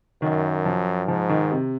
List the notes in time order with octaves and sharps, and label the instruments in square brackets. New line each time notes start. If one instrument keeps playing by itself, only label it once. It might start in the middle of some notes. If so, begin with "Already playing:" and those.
[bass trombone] F#2 [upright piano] D#3
[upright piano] F3
[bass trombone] G#2 [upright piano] F3
[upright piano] D#3
C3